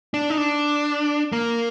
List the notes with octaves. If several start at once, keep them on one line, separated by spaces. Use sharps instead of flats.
D4
D#4
D4
A#3